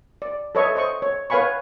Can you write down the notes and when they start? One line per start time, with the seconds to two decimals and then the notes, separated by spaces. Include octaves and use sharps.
0.22 D5
0.55 A4 B4 C#5 D#5 E5 C#6
0.75 C5 D#5 C#6
1.02 C#5
1.30 B4 C#5 F5 G#5 B5 C#6